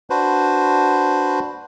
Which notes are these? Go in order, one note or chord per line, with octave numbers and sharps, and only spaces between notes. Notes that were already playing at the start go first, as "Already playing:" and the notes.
D4 F#4 B4 C5